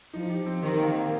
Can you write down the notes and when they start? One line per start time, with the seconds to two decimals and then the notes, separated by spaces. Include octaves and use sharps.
0.14 F3 D#4
0.30 G4
0.46 C4
0.62 D#3 G4
0.79 A#3
0.95 A#3